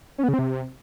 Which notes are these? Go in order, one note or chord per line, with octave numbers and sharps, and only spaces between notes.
C#4
B3
C#3
C4
C3